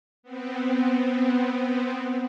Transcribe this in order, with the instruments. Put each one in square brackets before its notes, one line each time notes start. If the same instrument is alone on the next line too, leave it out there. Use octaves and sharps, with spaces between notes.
[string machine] B3 C4